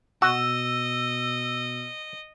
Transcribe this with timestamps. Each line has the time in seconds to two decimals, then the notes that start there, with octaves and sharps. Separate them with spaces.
0.22 B2 F#4 D#5 E6